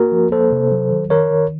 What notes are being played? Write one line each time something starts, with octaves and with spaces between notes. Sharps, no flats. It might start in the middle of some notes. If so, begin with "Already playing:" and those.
Already playing: A#3 F#4 A#4
F3
A#3 A4 C5
C3
F#3
D#3
D#3 A#4 C#5
D#3